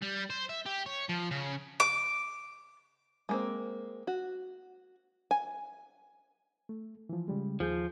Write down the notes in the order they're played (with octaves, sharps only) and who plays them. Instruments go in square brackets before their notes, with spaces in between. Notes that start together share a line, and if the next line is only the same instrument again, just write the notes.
[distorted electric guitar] G3
C5
E5
G4
C#5
F3
C#3
[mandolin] D6
[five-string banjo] G#3 A#3 C4
F#4
G#5
[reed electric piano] A3
E3 F3
C#3 G3 G#3
[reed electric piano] D#2 G#4 G6 [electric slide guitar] F3